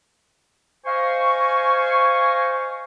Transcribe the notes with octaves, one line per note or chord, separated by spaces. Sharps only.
C5 D#5 F5 G#5 C#6